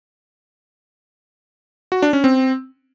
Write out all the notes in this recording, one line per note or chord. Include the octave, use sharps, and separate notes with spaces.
F#4
D4
C#4
C4